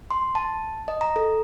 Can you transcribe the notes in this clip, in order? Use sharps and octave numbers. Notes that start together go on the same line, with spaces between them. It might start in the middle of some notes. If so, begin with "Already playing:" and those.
C6
A5
D#5
A#5
A4